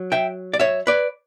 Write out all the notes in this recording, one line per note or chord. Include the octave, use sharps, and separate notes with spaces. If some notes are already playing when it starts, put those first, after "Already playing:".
Already playing: F#3
E5 G5
D5
C#5 E5
B4 D5